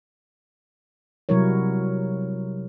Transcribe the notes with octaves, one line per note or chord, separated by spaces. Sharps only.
C3 F#3 G3 E4 A#4 C#5